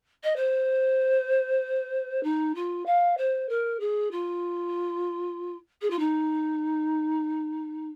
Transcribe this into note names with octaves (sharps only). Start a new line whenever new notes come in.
D#5
C5
D#4
F4
F5
C5
A#4
G#4
F4
G#4
F4
D#4